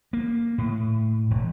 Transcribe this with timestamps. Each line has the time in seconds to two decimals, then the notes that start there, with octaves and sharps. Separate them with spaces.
0.13 A#3
0.58 A2
1.31 E1